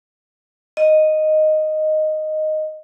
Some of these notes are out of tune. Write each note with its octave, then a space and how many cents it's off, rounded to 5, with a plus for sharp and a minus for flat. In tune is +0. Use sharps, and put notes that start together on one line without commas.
D#5 -5